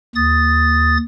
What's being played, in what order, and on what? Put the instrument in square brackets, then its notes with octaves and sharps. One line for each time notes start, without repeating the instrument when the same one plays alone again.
[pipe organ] D#2 D#6 A6